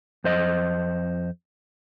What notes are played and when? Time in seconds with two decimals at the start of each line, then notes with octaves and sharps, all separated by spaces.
0.24 F2 C5 D#5